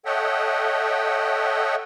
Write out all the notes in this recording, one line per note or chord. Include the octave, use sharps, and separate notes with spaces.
A4 C#5 D#5 E5 F#5 G5